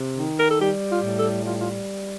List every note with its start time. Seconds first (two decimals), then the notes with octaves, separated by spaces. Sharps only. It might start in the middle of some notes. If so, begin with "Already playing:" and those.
Already playing: C3
0.17 D#3
0.37 A#4
0.48 A4
0.60 G3 G4
0.88 F4
1.02 A2
1.17 A4
1.44 G3 F4
1.60 F4